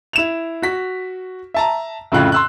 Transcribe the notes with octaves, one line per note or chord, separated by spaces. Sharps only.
E4 E7 F7
F#4 B6
E5 A5 A#5
F2 A2 C#3 F4 F#6
C6 E6 F#6